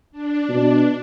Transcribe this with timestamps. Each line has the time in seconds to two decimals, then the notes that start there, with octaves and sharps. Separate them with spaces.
0.12 D4
0.49 B2